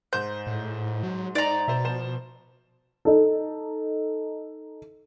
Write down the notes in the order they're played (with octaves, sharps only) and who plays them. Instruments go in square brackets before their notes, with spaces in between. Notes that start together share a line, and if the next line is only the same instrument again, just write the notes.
[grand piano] G#2 C5 [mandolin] G6
[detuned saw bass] A2
F#3
[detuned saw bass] D#4 [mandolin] D5 A#5
[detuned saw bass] B2 [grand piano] C5 E5
[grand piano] F3 C5 E7
[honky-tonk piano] D#4 A4